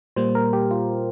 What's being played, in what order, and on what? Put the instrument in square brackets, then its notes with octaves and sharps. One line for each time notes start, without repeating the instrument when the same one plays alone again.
[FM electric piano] A#2 G3 A#3 C5
A#4
G4
F4